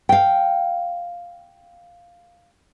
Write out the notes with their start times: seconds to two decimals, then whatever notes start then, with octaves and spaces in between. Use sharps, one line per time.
0.09 F5 G5